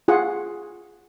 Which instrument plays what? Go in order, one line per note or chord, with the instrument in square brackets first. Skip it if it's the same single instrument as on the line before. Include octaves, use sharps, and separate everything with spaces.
[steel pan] F4 G#4 F#5